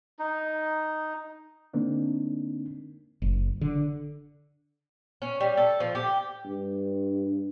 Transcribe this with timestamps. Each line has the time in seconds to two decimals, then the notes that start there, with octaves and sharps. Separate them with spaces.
0.19 D#4
1.73 D3 G#3 A#3 C4 D4 D#4
3.22 F#1
3.61 D3
5.22 C#4
5.40 G3
5.57 A4
5.80 F3
5.95 G4
6.45 G2